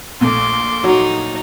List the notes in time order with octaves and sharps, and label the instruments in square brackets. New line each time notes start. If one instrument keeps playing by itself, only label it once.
[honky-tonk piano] A#1 A#2 A3 [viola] C6 D6
[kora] F#3 [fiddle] D#4